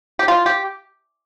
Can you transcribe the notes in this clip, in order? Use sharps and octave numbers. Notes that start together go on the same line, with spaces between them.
G4
F4
G4